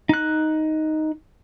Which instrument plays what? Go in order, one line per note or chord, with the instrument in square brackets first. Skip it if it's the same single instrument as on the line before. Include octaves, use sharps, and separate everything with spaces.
[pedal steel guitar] D#4 F#6